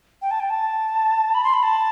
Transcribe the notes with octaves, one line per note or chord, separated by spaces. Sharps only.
G5
A5
G5
A5
B5
C6
B5
A5